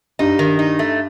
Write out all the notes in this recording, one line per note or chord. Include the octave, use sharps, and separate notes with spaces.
G2 D#4
D#3
D#4
A3